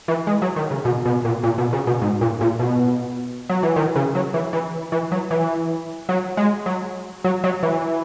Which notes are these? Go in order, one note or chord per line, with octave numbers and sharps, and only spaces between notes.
E3
G#3
F#3
D#3
C#3
B2
B2
A#2
A#2
B2
C#3
B2
G#2
A#2
A#2
B2
F#3
E3
D#3
C#3
F#3
E3
E3
E3
F#3
E3
F#3
G#3
F#3
F#3
F#3
E3